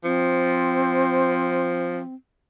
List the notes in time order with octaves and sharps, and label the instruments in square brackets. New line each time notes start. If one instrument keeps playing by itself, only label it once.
[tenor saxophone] F3 [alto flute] C4